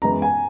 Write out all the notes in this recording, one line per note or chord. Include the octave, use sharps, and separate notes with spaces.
F#2 E3 G#3 B3 A#5
G#5